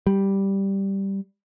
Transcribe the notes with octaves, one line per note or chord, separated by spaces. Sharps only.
G3